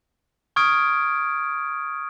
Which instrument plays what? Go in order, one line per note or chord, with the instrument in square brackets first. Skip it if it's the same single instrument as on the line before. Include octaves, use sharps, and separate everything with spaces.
[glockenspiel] C#6 D#6 F6 G#6 D7